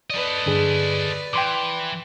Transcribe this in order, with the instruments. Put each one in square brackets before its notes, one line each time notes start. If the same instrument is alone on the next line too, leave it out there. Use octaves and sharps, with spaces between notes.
[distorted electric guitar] A4 D#5 [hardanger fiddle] B4 D5
[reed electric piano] G2 D3 G#4
[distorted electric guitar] E3 [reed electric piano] G5 C6 D6